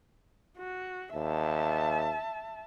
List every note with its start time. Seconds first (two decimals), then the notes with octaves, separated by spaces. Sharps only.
0.58 F#4
1.14 D#2 E5 A5